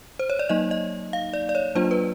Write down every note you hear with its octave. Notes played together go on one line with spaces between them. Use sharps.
C5
C#5
D5
F#3 A#3 D#4 D#5
D#5
F5
D5
D5
C#5
F#3 A#3 D4 F4 C5
B4